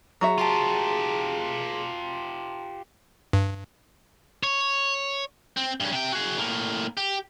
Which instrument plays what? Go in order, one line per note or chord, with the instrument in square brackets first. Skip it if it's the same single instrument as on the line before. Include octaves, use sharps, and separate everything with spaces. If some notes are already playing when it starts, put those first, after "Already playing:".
[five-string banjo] F#3 F#4 E5 [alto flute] G#4
[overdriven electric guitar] F4 G4 [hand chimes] A5 A#5 C6
[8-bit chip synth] G2
[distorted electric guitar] C#5
[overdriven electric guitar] C4
G2 C#4
C3 G5
F#4 G#4
A2 A#3
G4